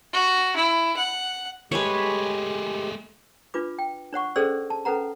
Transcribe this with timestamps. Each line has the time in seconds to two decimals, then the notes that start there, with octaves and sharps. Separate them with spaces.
0.13 F#4
0.56 E4
0.96 F#5
1.72 G#3 A3 G4 G#4 B4 C#5
3.54 D4 F4 B4 D6
3.79 G5
4.13 D4 C#5 F#5 C#6
4.36 C#4 G#4 A4 C5 D5 E6
4.70 A5
4.85 C#4 A4 B4 F#5 A#5